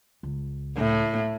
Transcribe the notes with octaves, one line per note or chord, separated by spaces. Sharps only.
C#2
A2